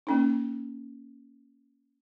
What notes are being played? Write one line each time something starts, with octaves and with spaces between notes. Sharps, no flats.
A#3 C#4 D#4